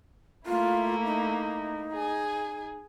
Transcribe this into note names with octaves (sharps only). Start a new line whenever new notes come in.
A3 A#3 E4 F4
D#4
G#4 G#5